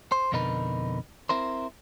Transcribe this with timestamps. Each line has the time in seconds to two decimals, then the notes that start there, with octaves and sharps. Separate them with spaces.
0.12 C5
0.32 F2 B2 D3 D#4 A#4 B4
1.29 C4 E4 A#4 C5